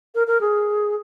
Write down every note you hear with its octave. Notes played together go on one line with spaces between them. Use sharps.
A#4
A#4
G#4